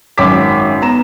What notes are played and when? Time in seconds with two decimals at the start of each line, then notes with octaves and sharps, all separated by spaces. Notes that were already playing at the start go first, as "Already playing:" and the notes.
0.18 G#1 F#2 C#4 G5 D6 B6
0.81 B3 A#5 E7